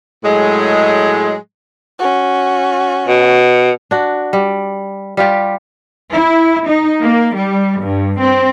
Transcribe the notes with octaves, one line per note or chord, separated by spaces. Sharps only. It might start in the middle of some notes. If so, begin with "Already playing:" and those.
A2 F#3 G#3
C#4 F#4
B2
D4 F#4
G3
G3 F4 G4
E4
D#4
A#3
G3
G2
C4